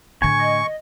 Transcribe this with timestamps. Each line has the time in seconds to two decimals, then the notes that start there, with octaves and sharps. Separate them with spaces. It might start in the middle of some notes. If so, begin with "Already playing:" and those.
0.22 A2 D3 G#5 C#6
0.38 D#5